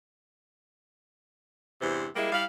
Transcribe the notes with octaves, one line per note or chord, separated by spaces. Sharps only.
E2 G2 C3 C5
G3 G#3 A#3 E4
G3 E4 F5